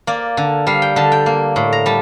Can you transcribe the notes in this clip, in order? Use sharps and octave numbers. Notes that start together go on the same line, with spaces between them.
A#3 D5
D3
G3 F5
G5
D3 A5
G5
A#3
A2
A#5
G3 A5